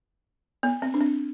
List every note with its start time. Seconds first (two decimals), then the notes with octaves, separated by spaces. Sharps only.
0.63 B3
0.82 C4
0.94 D4
1.01 C4